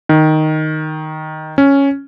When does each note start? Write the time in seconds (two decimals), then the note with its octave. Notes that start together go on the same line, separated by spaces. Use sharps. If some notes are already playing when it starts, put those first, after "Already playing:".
0.09 D#3
1.58 C#4